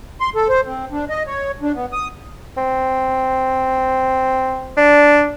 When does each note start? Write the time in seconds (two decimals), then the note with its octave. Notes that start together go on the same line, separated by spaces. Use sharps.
0.21 C6
0.35 A4
0.49 C5
0.66 C4
0.92 D4
1.09 D#5
1.27 C#5
1.62 D4
1.75 B3
1.93 D#6
2.57 C4
4.77 D4